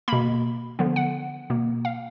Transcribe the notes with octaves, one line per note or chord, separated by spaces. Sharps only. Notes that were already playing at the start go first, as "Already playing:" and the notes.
B2 A#3 B5
D3 F3 B3
F#5
B2 A#3
F5